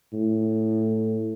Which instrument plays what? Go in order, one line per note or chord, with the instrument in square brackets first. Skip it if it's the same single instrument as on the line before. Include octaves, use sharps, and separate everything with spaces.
[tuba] A2